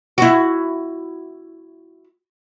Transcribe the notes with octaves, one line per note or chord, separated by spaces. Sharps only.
E4 F#4